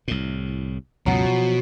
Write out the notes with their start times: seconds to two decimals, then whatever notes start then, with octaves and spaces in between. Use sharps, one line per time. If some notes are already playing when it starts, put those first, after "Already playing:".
0.08 C2 A2
1.06 C#2 F#2 B2 F#3
1.25 F3